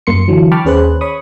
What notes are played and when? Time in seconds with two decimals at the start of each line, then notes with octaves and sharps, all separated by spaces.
0.07 F#2 A#3 C6 C#7
0.27 D3 E3 F#3
0.52 G5 A5 B5 C#6 D6 F6
0.65 D#2 C#4 G#4 B4 C5 F#6
1.01 C#5 B5 C#6 D#6